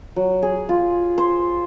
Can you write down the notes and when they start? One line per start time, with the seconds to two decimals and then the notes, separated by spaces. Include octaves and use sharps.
0.16 F#3
0.42 G#4
0.69 F4
1.18 C5